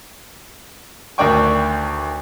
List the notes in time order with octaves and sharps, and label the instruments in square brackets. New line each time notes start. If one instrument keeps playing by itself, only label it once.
[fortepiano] D2 D#3 D4 D5 G5 C#6